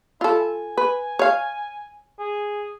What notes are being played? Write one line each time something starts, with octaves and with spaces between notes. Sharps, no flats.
E4 F4 A4
G#5
B4
C#5 F5
G#4